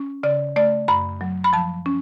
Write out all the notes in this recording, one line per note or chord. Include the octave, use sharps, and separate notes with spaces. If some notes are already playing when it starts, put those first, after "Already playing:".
Already playing: C#4
C#3 D5
A3 D5
F#2 B5
F#3
B5
F3 A5
C#4